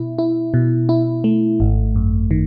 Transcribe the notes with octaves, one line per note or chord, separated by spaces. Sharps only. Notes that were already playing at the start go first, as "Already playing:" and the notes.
Already playing: B2 E4
E4
B2
E4
A3
G#1
F#2
D#3